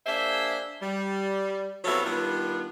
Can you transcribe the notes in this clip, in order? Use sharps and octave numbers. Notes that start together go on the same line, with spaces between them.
A#3 D4 G#4 C5 E5
G3
C3 F#3 B3 E4 A4 F5
D#3 G3 B3 D4 F4